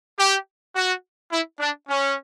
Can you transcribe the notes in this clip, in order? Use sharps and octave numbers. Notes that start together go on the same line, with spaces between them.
G4
F#4
E4
D4
C#4